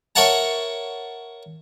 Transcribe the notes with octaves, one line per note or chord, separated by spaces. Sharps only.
A#4 C#5 E5 F#5 A5 A#5